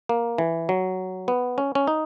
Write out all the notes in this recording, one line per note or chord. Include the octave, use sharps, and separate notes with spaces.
A#3
E3
F#3
B3
C#4
C#4
D#4